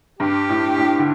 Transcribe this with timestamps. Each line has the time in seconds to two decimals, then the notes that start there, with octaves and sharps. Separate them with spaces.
0.19 G2 G4
0.49 A2
0.77 A2
0.99 D3